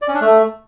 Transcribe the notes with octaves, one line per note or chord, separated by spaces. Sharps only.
D5
C#4
D4
A3